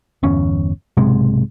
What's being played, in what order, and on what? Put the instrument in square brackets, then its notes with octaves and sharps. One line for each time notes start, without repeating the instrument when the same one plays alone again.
[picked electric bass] G1 E2 C#4
B1 G#2 C3 G#3